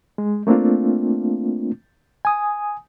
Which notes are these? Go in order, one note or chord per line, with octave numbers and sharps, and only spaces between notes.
G#3
A3 A#3 C4 D4 F4
G#5 D#6